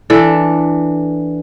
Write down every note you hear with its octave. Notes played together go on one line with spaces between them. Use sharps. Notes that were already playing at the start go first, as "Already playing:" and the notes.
E3 D4 A4